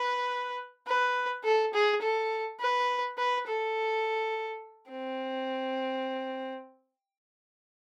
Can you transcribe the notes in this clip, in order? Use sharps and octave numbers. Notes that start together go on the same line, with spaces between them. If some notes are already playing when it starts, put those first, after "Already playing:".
Already playing: B4
B4
A4
G#4
A4
B4
B4
A4
C4